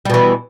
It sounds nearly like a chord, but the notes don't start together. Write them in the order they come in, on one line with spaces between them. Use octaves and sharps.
G3 B2 E3